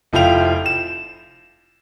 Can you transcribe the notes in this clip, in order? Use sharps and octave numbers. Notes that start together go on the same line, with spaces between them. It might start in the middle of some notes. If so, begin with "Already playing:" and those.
F1 F3 E4 F5 G5 F7
E7